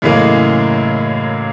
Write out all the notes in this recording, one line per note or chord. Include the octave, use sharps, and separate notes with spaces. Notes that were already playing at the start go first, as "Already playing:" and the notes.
F#2 A2 C#3 E3 G#3 A#3